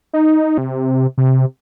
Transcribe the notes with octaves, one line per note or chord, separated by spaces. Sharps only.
D#4
C3
C3